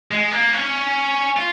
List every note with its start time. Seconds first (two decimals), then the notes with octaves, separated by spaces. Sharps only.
0.11 G#3
0.32 A#3
0.53 C#4
1.37 F4